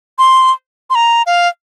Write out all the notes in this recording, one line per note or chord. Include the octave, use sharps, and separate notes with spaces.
C6
C6
A#5
F5